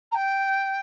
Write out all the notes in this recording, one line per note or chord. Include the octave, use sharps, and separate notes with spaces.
A#5
G5